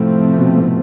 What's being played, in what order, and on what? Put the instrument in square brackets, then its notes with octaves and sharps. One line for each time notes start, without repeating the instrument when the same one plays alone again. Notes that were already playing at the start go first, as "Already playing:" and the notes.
Already playing: [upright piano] A2 [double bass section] C3 F3 A3 C4
[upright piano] B2
A2